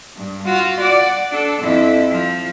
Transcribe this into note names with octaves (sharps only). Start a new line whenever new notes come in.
G2
F4 F#4
D5 F#5
D4 A4
F2 E4
F3